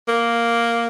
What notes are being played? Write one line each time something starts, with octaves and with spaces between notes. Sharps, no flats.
A#3